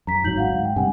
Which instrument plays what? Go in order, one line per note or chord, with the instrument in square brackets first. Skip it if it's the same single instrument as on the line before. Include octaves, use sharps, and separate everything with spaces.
[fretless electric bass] F#2 [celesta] A#5 B6
[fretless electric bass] D1 G#1 F#3 [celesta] D#4 G6 F#7
[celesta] F5 F#5
[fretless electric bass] G#2
[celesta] G5
[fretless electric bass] G2 C3 [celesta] F#5 G#5